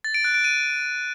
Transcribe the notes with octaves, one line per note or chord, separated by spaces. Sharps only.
A6
D7
F#6
D7
D#7